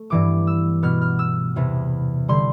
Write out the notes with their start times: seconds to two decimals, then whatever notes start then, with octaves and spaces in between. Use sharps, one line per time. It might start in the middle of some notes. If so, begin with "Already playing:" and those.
Already playing: A3
0.10 G2 E3 B3 D6
0.47 E6
0.83 B2 B3 F6
1.01 F6
1.19 E6
1.56 E2 C3 E3 B3
2.28 D3 G3 C6